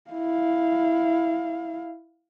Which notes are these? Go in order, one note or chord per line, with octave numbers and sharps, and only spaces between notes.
E4 F5